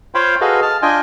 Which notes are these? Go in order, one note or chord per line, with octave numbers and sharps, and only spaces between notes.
F4 C5 C#5 F5 G5 B5
F#4 G#4 A4 B4 D#5 F5
A5 F6
D4 F4 D#5 G5 G#5